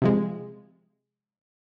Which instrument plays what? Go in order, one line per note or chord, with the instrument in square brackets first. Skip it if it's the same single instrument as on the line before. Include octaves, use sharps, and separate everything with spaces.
[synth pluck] C3 F3 G#3